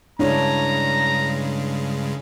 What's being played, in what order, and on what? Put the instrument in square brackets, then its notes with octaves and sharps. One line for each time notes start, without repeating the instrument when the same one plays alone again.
[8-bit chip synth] G2 C#3 G#3 [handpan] D4 E4 C#5 [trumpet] A#5